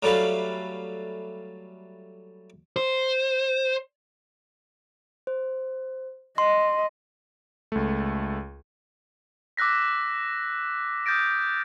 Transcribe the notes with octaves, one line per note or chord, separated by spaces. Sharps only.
F#3 G3 A3 B4 F5
C5
C5
D#5 C6
C#2 A3
D6 E6 F#6 A#6 B6
D#6 F6 G6 A6 A#6 D7